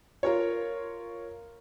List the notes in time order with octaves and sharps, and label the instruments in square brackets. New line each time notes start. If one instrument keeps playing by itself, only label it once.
[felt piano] F4 A#4 C#5